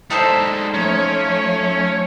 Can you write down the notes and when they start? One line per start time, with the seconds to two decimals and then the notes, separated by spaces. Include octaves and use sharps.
0.10 G3 G#3 D#4 A4 C5
0.74 F3 A3 C#4 C#5